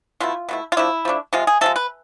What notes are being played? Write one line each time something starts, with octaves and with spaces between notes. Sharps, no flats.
B2 A3 E4 F4
B2 A3 E4
F4
F3 A3 D4 E4
F3 A3 D4
C3 F3 G#3 F4
G#4
C3 F3 G#3 A4
B4